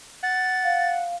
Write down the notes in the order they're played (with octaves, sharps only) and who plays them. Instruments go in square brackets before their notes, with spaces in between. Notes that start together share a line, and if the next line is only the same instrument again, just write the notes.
[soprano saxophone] F#5 [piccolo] A6
[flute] F5